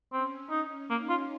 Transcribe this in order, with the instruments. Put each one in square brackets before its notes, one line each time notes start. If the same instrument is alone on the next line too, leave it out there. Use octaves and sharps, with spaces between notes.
[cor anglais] C4 [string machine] C#4
[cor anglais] D#4
[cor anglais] A#3 [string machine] D#4
[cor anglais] F4